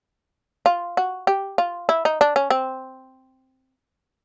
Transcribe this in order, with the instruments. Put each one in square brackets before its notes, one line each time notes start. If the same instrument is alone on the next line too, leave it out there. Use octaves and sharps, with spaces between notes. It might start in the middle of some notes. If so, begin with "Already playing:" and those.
[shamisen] F4
F#4
G4
F4
E4
D#4
D4
C#4
C4